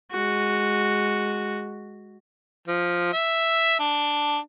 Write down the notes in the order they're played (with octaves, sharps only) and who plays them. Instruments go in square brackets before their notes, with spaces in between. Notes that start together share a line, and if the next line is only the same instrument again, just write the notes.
[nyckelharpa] G#3 F#4
[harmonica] F3
E5
D4